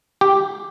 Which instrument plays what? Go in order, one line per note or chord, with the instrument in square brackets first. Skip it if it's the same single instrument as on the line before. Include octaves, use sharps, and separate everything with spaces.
[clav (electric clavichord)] G4